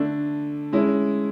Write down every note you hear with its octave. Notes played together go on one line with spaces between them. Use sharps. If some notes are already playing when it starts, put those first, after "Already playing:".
Already playing: D3 A3 D4
G#3 C#4 E4